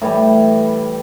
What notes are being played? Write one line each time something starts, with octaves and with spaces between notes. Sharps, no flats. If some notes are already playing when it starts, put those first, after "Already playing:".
A2 E3 G3